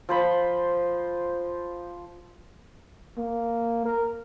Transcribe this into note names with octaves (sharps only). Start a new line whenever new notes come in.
F3 C5 B5
A#3
A#4